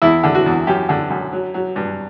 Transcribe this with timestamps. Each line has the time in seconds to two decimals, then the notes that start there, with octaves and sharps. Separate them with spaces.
0.02 E2 E4
0.24 D3
0.35 F#4
0.46 E2
0.67 F#2 G4
0.89 D3
1.10 F#2
1.33 F#3
1.54 F#3
1.76 G2